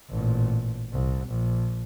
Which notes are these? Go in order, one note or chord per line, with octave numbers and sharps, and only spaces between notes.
A1 A#2
C2
A#1